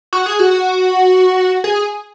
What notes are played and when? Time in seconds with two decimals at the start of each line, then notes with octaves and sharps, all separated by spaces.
0.13 F#4
0.26 G#4
0.40 F#4
1.64 G#4